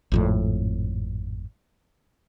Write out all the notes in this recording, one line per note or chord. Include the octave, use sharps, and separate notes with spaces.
G#1 F2 A2